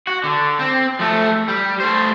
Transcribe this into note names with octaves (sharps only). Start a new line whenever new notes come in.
F#4
D3
C4
F3 A3
G3
A3 C5